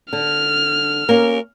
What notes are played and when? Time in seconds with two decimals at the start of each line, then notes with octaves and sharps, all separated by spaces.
0.13 D3 F6
1.09 A#3 C#4 A#4